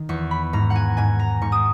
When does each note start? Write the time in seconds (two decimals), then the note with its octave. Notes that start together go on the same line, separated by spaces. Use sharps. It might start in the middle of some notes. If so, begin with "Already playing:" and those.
Already playing: D#3
0.09 E2 C#6
0.31 B5
0.53 G#2 A#5
0.70 F#5
0.75 G#5
0.97 G#2 G#5
1.19 A#5
1.41 G#2 C#6
1.52 D#6